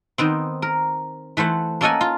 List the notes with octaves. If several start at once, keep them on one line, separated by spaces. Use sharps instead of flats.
D#3 B3 C4
A#4
E3 A3 C5 F#5
A#3 C#4 A4 D#5 F#5 G#5
F4